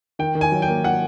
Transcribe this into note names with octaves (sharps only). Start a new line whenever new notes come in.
D#3 G5
D#3
G#5
F#3
G5
A#3
F#3 F#5